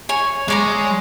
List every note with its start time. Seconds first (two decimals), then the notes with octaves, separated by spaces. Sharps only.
0.09 C#5 G#5
0.48 G#3 C#5 D5 A#5